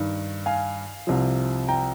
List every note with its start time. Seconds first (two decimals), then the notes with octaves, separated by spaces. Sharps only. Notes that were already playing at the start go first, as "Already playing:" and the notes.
Already playing: G2 D#3
0.46 F5 G#5
1.07 C2 C3 F3
1.68 G5 A#5